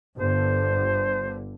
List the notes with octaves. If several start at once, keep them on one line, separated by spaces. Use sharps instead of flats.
G1 D3 C5